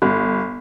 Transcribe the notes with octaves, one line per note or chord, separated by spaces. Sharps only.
G1